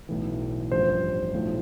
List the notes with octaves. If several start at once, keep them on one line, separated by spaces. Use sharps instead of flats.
B1 A2 E3
A1 G2 F3 C5
B1 A2 F3